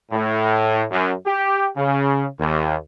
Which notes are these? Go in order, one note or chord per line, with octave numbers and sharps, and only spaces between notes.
A2
F#2
G4
C#3
D#2